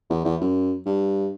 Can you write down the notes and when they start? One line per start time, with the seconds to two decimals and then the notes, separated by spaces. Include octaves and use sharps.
0.10 E2
0.25 E2
0.41 F#2
0.86 G2